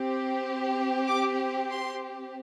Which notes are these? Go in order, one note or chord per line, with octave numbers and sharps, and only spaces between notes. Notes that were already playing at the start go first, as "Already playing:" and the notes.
Already playing: C4 G4
D6
C6